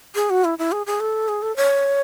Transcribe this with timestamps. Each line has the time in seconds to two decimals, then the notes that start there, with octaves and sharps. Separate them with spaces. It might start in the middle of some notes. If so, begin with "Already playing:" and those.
0.15 G#4
0.30 F#4
0.44 E4
0.58 E4
0.72 G#4
0.86 G#4
1.00 A4
1.28 G#4
1.42 A4
1.56 C#5